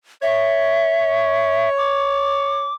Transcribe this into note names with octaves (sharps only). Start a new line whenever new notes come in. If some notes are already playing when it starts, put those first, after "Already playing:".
C#5 E5
D6